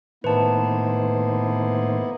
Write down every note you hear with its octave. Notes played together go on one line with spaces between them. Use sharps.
A2 D#3 A#3 B3 E4 B4 C5 A5